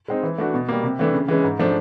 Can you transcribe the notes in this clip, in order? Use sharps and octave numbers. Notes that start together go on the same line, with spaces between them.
G#3 C4 D#4
E3
A3 D4 F#4
B2
G3 A#3
C3
E3 A3 D4
C#3
E3 G#3 C#4
G#2
F3 A3 D4